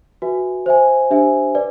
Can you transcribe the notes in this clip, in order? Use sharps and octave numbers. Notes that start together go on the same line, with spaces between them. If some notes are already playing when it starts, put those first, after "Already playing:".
F#4 B4 E5 G#5
C5 E5 G#5
D4 G4 C5 E5 G#5
B4 D5